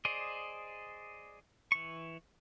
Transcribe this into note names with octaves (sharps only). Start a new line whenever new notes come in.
G#4 C5 D5 D#5
E3 C#6